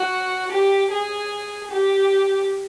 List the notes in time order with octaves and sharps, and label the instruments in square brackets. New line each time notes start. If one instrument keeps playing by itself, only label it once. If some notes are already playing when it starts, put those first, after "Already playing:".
Already playing: [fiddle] F#4
G4
G#4
G4